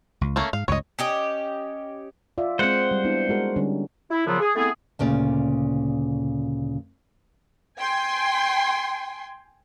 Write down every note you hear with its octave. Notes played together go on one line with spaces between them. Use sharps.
C#2
A3 A#3 C#4
G#2 F5
C#2 G2 C#5 D#5
C#4 G4 D#5
F4 D5 E5
G#3 C4 C5 F#5
G3
B3 D4 E4
G#3 F#4 A#4
D3 G3 C#4
E4
A#2 C#3 F3 F#3 B3 C4
G#4
A3 B3 C4 E4 G#4
D2 A#2 C#3 D5
G5 G#5 C6